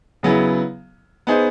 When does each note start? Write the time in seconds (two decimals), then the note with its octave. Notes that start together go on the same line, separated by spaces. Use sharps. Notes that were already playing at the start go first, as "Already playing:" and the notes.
0.23 C#3 F#3 B3 E4 G#4
1.27 B3 D#4 G#4 C5